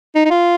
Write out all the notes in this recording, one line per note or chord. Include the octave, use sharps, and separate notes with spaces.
D#4
D#4
F4